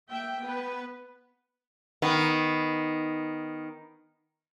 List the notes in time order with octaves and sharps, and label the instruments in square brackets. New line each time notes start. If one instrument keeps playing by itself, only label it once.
[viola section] A#3 E5 G5
B3 B4
[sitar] D#3 B3